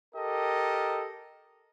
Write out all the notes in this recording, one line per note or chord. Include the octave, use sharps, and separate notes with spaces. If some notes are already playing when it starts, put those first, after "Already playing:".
G4 A4 A#4 D#5